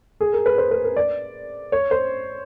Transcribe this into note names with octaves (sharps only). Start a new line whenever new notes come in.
G#4
A#4
B4
C5
B4
A#4
D5
C#5
C5